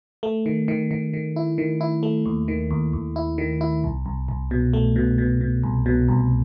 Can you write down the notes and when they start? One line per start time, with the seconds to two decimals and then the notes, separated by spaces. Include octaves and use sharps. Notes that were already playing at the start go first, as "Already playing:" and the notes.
0.23 A3
0.46 D#3
0.68 D#3
0.91 D#3
1.13 D#3
1.36 E4
1.58 D#3
1.81 E4
2.03 A3
2.26 D#2
2.48 D#3
2.71 D#2
2.93 D#2
3.16 E4
3.38 D#3
3.61 E4
3.84 C2
4.06 C2
4.29 C2
4.51 B2
4.73 A3
4.96 B2
5.18 B2
5.41 B2
5.63 C2
5.86 B2
6.08 C2